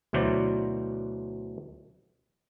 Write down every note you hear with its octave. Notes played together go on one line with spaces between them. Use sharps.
D2 B2 E3 F#3 C5 D5